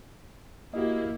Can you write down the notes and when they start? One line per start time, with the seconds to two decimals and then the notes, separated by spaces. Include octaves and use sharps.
0.74 A#3 E4 F#4 G4 D#5